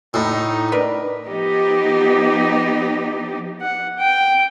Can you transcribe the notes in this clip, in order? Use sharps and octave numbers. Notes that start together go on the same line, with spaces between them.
A2 D#4
D4 A#4 B4
F3 B3 D#4 G4
F#5
G5